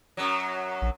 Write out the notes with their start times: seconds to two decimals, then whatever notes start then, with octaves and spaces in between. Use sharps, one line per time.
0.17 F#2 F#3
0.82 A#1